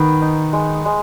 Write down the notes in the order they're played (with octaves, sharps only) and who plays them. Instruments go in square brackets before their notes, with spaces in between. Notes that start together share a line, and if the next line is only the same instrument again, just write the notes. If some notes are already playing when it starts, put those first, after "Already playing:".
Already playing: [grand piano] D#3 [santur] B3
[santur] D#4
G#3
G#3